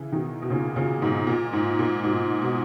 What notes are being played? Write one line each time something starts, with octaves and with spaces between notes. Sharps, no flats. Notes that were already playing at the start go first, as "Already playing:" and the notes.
Already playing: C#3 E3
B2 D#3
B2
A#2 C#3
A#2 C#3
G#2 B2
A#2
G#2
A#2
G#2 B2
B2